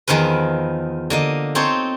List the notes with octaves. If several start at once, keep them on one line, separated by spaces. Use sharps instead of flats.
E2 D#3 F3 A#4 B4
D3 A#3 D#5
C4 D#4 A4 C5 C#5